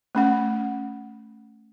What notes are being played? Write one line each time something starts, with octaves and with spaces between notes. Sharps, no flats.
A3 C#4 F#5